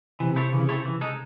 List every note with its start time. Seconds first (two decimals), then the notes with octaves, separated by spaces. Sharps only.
0.20 C3 E3
0.36 C4 E4 A4 C#5
0.52 C#3 E3
0.69 C4 E4 A4 C#5
0.85 E3
1.01 G#3 D#4 A4